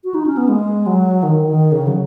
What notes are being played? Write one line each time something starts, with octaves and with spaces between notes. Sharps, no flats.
F#4
D#4
C#4
B3
G#3
F#3
D#3
D#3
C#3
F#3